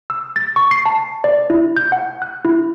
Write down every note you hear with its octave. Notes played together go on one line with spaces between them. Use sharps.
E6
A6
C#6
C7
A5
D5
E4
G6
F#5
F#6
E4